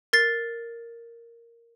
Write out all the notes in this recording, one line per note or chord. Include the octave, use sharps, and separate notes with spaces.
A#4 A6 C7